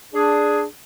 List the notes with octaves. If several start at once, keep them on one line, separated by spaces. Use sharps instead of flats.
D4 G#4